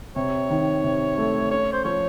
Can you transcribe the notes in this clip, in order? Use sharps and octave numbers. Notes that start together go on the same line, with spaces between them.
C3 C#5
D#3
C3
A3
C#4 C#5
C5
F3 C#5